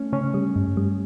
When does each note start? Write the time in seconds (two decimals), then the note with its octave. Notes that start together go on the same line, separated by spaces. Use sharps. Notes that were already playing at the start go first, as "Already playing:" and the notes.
Already playing: A3 C#4
0.13 C#3 C#4
0.34 G3
0.56 G2
0.77 G3